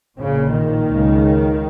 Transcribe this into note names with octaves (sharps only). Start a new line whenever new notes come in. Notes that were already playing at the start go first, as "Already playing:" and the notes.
A#1 A#2 C#3
D#3
C#2 C#3